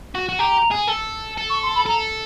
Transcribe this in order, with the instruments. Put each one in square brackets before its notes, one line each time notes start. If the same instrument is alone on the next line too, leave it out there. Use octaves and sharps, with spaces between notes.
[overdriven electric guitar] F#4
F#4
[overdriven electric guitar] G4 [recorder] A#5
[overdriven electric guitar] G#4
A4
A4
[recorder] C#6
C6
B5
[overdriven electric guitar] A4 [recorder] A#5